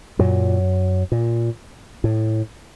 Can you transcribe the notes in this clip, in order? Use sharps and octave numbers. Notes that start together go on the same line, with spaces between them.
F#2 A#2 F#3
A#2
A2